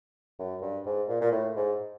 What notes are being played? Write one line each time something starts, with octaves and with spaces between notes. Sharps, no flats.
F#2
G2
G#2
A#2
A#2
A2
G#2